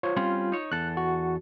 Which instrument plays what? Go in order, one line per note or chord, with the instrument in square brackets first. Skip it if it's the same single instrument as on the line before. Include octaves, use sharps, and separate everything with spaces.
[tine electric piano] F4 C5 C#5
[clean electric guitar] G3 C4 C#4 [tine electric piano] F4
[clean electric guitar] D#4 C#5
[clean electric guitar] E2 A4 [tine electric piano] F#6
[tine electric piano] F#4